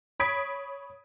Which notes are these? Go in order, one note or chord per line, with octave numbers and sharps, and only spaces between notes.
C#5 B5 D#6 G#6 B6 D7